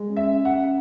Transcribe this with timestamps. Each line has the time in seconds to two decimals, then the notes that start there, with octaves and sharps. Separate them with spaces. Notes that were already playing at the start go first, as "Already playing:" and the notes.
Already playing: G#3
0.09 C#4
0.17 E5
0.31 C#4
0.45 F#5
0.53 C#4